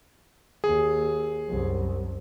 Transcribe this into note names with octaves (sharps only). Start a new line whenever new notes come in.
D#2 G#4
C2 F#2